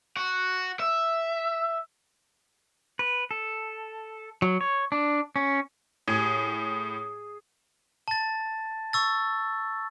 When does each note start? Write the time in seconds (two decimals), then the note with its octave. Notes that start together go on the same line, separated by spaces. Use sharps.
0.17 F#4
0.80 E5
2.99 B4
3.31 A4
4.42 F#3
4.61 C#5
4.92 D4
5.36 C#4
6.08 A2 G#4
8.08 A5 A6
8.93 C#6 E6 A6